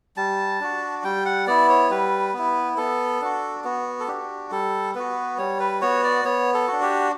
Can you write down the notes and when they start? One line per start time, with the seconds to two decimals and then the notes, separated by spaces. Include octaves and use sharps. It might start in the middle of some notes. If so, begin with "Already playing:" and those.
0.17 G3 A5
0.61 D4 F#4
1.04 G3 G5
1.26 F#5
1.47 B3 E4 D5
1.69 C#5
1.91 G3 B4
2.34 B3 E4
2.77 B3 A4
3.21 D4 F#4
3.64 B3 F#4
4.00 A4
4.08 D4 F#4 G4
4.51 G3 A4
4.95 B3 F#4 B4
5.38 G3 C#5
5.60 B4
5.81 B3 F#4 C#5
6.04 D5
6.25 B3 C#5
6.54 A4
6.68 D4 F#4
6.82 G4